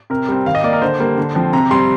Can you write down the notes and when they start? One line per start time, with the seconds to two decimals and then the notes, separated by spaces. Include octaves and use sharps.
0.10 C3 A#4
0.28 G3 C4
0.46 D#3 F5
0.55 D#5
0.64 A#3 D5
0.73 A#4
0.82 D3 C5
1.00 G3 A#3
1.18 D3
1.35 F3 C4
1.53 C3 A#5
1.71 G3 C4 C6